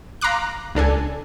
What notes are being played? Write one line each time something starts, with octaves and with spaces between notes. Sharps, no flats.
F5 A#5 C6 D6 F#6
C#2 D4 A4 G#5